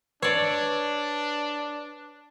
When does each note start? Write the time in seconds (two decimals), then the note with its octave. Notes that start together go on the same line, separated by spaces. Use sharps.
0.22 D4 B4 C#5 D5